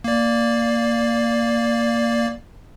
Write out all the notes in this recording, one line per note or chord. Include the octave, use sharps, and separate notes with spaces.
A#3 D5